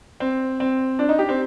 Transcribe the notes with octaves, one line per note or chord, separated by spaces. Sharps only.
C4
C4
D4
D#4
G4
C4